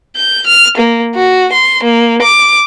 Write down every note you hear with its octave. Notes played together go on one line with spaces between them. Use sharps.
G6
F6
A#3
F#4
C6
A#3
D6